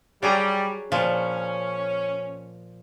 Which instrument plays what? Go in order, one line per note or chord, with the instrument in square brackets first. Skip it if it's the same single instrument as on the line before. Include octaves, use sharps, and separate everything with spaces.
[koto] F#3 G#4 A#5 [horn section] G3
[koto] A#2 F3 [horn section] C#4